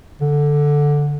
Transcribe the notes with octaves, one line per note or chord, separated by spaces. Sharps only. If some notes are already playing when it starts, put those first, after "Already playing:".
D3